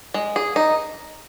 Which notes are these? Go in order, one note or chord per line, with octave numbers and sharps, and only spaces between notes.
G#3
G#4
D#4